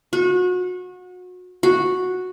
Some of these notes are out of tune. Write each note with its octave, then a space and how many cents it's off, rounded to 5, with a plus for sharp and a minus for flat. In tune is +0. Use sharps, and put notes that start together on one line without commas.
F#4 -30
F#4 -10